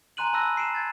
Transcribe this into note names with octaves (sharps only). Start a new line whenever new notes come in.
G#5 A#5 C6 F#6 D#7 F#7
A5 B5 E6 F#6 A#6 D#7
C7 D7 E7
G#6 A6